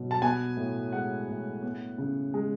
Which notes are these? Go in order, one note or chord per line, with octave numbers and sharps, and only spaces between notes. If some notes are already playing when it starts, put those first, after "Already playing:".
Already playing: B2 F#3
A5
B3 G#5
A2
G#3 F#5
A2
B3
C#3
G#3